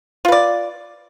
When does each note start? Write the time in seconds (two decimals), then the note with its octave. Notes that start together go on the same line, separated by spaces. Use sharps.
0.25 F4
0.28 B4
0.32 D5